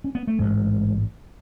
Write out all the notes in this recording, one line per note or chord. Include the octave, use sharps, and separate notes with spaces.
C#4
B3
A3
A1 G#2 G#3